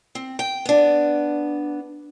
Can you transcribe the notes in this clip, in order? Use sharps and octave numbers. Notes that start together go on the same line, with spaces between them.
C4
G5
B3 D4